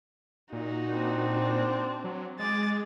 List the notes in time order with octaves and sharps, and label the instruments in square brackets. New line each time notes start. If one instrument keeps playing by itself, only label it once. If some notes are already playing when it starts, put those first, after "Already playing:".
[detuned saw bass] A#2 [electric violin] D#4 F#4
[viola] C4 D4
[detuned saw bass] F#3
[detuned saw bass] G#3 [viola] G#4 [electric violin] D6 A6